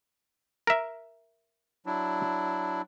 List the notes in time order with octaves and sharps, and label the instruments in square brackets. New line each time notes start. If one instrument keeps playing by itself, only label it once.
[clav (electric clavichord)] A#4 E5
[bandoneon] F#3 D4 E4